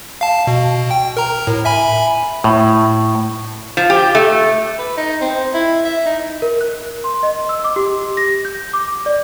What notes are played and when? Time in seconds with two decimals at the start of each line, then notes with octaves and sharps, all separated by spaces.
0.21 F5 A5
0.47 B2
0.91 G5
1.17 A#4 A#5
1.47 A2
1.65 E5 G#5 B5
2.44 A2
3.77 F3
3.90 G4
4.15 A3
4.79 B4
4.97 D#4
5.21 C4
5.54 E4
5.85 E5
6.06 D#4
6.42 A#4
6.61 F#6
7.04 C6
7.23 D#5
7.49 E6
7.64 D6
7.76 G4
8.17 A#6
8.45 G6
8.73 D6
9.06 D5